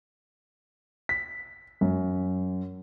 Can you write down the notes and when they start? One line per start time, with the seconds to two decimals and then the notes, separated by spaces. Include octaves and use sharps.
1.09 B6
1.81 F#2